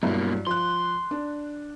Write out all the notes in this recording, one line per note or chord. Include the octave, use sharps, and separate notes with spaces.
G2 B2 F#3 A#3 E4
F3 C6 F#6
D4